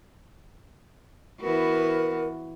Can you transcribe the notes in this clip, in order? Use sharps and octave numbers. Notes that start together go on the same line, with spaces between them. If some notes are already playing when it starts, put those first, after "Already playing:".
E3 B3 F#4 A#4